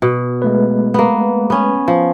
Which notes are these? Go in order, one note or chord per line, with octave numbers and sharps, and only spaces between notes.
B2
G#3 A3 B4
A#3 B3
B3 C#4
F3